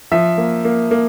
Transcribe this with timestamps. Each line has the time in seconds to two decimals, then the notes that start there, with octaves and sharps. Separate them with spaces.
0.12 F3 E5
0.38 A#3
0.65 A#3
0.91 A#3